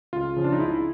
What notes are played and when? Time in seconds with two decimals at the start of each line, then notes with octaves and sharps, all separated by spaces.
0.13 C#2 F4
0.36 C#3 F3
0.44 D4
0.52 D#4
0.60 C#2 E4